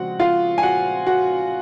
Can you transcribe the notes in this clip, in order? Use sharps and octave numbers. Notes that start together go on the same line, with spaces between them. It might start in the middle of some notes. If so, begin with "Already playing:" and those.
Already playing: C#3 F3 G#3 C4 F#4 F#5
F4 F5
G#5
F#4 F#5
F#4 F#5